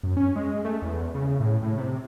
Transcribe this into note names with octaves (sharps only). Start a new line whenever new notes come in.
F#2
C#4
G#3
A3
E2
C#3
A2
A2
C3